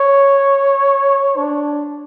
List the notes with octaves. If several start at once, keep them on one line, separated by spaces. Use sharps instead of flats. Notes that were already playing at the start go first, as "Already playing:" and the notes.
Already playing: C#5
D4